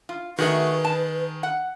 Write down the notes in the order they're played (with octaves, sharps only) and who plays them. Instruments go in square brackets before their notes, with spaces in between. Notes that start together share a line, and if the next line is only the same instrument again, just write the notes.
[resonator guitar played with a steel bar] F4
[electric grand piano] D#3 G#4 [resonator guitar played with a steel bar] A3 F#4 [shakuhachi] B4
[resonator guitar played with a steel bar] A5
F#5